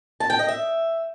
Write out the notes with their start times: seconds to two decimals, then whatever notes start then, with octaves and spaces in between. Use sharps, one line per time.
0.20 A5
0.30 G5
0.39 D#5
0.48 E5